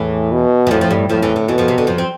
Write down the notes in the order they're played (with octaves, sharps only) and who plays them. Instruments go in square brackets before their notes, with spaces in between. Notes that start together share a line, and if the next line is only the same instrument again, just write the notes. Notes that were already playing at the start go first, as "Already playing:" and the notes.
Already playing: [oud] E2 E3 [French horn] A2
[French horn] B2
[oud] E3
[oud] F2 F3 [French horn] A2
[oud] F3
G2 G3
[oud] F2 F3 [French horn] A2
[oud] E2 E3
D3
[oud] E2 E3 [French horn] B2
[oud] F2 F3
C3
D3
F2 F3
C4